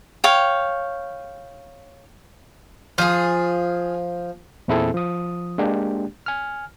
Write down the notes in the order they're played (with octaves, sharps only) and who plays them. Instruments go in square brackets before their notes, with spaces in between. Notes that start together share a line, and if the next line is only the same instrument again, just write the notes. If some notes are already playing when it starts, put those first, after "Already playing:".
[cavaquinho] C#5 F5 G5
[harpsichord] F3 [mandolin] F4 G#4
[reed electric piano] E2 A#2 C4 E4 G#4 A4
F3 D#6
G#3 A#3 D4 G4
G#5 F6